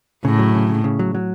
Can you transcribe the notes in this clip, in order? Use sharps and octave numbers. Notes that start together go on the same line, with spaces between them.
A2 C#3
F#3
C#3
C#3
C#3
F#3
F#3